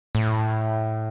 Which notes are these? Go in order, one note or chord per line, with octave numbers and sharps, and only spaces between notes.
A2